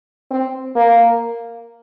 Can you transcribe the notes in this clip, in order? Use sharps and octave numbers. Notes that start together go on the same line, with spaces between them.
C4
A#3